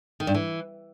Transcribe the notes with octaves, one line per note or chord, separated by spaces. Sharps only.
D#3
G2
E3